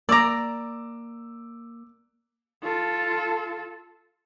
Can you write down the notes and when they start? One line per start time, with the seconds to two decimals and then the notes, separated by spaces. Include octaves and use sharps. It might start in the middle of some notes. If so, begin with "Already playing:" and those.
0.09 A#3 D5 A#5 D6 E6
2.63 F4 A4